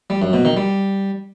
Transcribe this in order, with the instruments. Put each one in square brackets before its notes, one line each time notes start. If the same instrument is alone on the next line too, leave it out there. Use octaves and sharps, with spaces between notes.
[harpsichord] G3
F#2
B2
D#3
G3